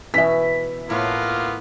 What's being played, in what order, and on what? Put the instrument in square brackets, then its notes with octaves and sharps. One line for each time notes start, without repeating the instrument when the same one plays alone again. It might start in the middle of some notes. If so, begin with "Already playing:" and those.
[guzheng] B2 E3 [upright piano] E5 B6
[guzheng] A2 [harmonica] A#3 B3 F4